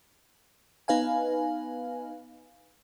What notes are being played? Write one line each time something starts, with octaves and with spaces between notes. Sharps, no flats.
B3 D#4 B4 F5 G#5